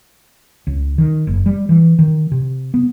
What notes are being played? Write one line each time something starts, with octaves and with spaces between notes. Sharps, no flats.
C#2
D#3
F#1
G3
E3
D#3
C3
B3